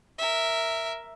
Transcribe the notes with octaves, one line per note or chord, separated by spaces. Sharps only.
A#4 E5